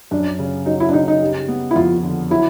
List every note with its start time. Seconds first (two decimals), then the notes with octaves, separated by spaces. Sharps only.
0.11 F#2 D4
0.39 C#3
0.66 F#3 D#4
0.80 E4
0.89 D4
0.93 C#3 D#4
1.08 D#4
1.21 G3
1.48 B3
1.71 E4
1.76 F2 F4
2.03 D3
2.30 F#3 E4